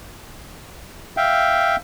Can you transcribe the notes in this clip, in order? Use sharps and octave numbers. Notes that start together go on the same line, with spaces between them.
E5 F5 G5